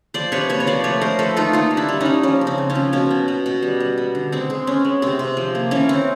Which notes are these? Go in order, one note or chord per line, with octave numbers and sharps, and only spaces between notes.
F3 C5 D5
C3 B4 C#5
A#3 B4 C#5
C#5
F3 C5 D5
A3 B4 C#5
A3 A#4 C5
F3 A4 B4
A3 D#4 F4
A#3 D#4 F4
G3
D4 E4
G3
C#4 D#4
G3
F3 C#4
C#3
C4
C#3
C#4
F3
B2 C#4
B3
B2
B2
G3
G3
B3
D3
G#3 C4
G#3
B3 C#4
G#3
C3 C4
C3
F3
A#3
E3 C#4
E3 C4